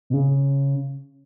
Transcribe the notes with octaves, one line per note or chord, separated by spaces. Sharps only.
B2
C#3